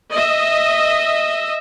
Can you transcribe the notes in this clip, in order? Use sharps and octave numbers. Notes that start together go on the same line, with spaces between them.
D#5 E5